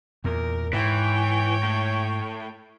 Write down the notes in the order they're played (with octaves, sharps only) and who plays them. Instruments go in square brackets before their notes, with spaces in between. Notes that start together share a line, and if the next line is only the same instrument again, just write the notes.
[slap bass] E2 A#2 [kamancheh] A#4
[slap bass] G#2 [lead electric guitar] E3 [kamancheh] C#5 G5
[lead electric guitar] A2